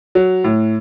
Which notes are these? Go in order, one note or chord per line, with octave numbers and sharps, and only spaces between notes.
F#3
A2